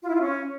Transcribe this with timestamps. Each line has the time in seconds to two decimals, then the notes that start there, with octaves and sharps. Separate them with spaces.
0.02 F4
0.08 E4
0.14 F4
0.20 C#4